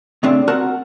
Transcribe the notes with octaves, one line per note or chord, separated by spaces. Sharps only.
C#3 A3 C4 D4
C4 F#4 A#4 F#5 A5